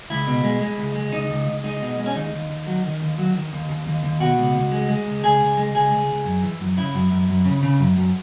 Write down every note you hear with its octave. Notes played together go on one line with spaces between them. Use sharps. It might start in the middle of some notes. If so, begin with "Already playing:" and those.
C#2 E4
B2
G#3
G#3
C#2
G#3
C#2 D#4
C#2
C#2
G#3 D#4
B2
G#3
C#4
D#2 D#4
D#2
D#2
F#3
D#3
D#2
F#3
D#3
D#2
D#2
D#2
D#2
B2 F#4
C#2
C#2
G#3
G#3
C#2
C#2 G#4
C#2
G#3
C#2 G#4
C#2
C#2
F#2
E3
F#2
C#3 E4
F#2
F#2
F#2
C#3
C#3
F#2
F#2